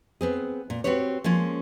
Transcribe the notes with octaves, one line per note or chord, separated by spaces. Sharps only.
B3 C4 G#4
A#2
C4 F#4 G4 B4 C#5
F3 G#3 A#3 C#4 F4